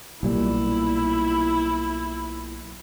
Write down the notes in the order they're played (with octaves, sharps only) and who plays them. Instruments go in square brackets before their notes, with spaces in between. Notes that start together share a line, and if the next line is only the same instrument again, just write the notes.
[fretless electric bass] B1 A#2 G3 [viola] E4